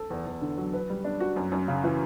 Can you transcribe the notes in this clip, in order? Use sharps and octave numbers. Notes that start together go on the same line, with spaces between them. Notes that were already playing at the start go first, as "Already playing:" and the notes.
Already playing: A4
E2
E2
D3
F#3
B4
G3
D4
F#4
F#2
F#2
C#3
E3